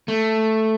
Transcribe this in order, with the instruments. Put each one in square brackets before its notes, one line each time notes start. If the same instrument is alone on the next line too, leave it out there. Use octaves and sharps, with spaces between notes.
[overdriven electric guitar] A3